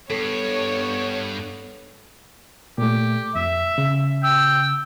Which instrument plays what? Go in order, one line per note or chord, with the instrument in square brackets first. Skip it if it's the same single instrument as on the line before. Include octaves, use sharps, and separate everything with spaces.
[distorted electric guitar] G2 [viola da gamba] B3 [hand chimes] A4 [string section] C#5
[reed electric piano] A#2 A3 [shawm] G4
[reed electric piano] F2 [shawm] E5
[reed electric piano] C#3
[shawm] G5 [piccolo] E6